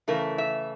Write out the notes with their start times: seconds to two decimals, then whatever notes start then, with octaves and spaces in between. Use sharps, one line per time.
0.08 C#3 E3 A3 A#4
0.38 E5